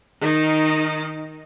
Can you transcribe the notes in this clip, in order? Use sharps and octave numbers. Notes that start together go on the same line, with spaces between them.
D#3 D#4